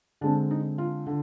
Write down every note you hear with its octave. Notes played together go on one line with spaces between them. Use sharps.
D3 G#3 C4 D4
D#4
F4
D3